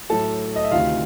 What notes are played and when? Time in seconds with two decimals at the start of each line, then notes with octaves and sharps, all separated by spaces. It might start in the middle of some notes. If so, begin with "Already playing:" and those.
0.10 A2 F#3 A3 A4 A5
0.56 D#5
0.63 E5
0.71 D2 C3 D#3 F4 F5